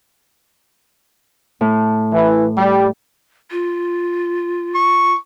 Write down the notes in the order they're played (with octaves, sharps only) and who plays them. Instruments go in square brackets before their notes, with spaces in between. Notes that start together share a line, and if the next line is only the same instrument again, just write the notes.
[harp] A2
[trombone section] E3
G3
[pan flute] F4
[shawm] C#6